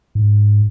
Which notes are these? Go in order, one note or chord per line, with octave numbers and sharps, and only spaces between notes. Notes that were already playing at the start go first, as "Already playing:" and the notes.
G#2